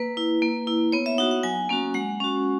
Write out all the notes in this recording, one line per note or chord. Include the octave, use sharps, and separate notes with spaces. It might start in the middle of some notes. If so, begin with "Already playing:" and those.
Already playing: A#3 B4
E4
A#3
E4
B3 C#5
E5
D#4 F#4 F#5
F#5
F#3 G#5
A#3 C#4 F#4
G#3 F#5
C#4 F#4